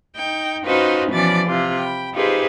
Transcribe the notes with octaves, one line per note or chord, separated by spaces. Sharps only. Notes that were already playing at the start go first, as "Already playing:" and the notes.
D#4 G5
C#4 D#4 F4 F#4 B4 C5
B2 E3 F3 C#4 D5 A6
C3 F4
G5 B5
D#4 F4 G4 G#4 B4 C5